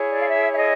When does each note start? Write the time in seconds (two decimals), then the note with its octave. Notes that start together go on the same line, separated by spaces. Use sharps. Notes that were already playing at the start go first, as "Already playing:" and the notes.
Already playing: E4 G#4 C#5
0.10 D5
0.19 F5
0.28 E5
0.51 E5
0.56 D#5